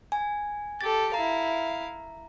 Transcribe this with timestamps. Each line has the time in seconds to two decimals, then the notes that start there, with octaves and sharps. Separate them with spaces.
0.12 G#5
0.81 G4 A4 A6
1.14 E4 F5 A#5